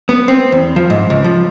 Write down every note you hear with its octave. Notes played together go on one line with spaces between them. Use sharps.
B3
C4
E2
F3
G#2
C#2
F3